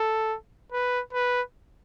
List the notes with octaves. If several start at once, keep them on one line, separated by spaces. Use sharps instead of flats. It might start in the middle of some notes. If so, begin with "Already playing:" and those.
Already playing: A4
B4
B4